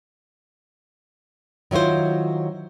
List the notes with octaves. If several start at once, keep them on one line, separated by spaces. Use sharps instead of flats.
D#3 F#3 E4 F4 C5